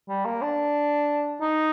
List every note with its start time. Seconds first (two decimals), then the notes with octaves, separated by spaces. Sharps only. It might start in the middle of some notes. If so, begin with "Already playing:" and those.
0.09 G3
0.25 A#3
0.42 D4
1.41 D#4